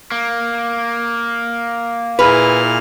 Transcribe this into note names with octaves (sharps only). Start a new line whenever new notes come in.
A#3
A#2 E4 G#4 B4 F6